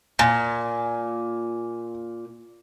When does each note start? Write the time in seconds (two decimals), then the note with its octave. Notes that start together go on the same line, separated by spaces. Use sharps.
0.19 A#2 G#5